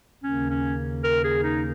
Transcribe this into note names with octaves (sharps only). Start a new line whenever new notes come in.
D#2 C#3 A#3 C#4
C#4
A#4
G#4
D#4